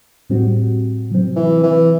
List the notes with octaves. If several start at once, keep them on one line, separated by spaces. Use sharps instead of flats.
A2 G3 C4 F#4
C3 F#3 C4
E3
E3